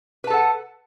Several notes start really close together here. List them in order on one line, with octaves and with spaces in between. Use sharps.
B4 A5 A4 F#5